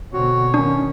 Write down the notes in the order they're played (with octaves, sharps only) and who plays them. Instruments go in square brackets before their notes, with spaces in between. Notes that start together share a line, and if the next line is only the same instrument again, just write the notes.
[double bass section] B2 D3 C4 [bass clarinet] F#4 [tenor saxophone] C#5
[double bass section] D#3 [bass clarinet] C#4 [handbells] D4